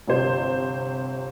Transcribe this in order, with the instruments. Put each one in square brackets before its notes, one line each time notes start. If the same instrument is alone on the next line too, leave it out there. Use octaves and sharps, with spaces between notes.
[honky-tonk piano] G1 C3 C5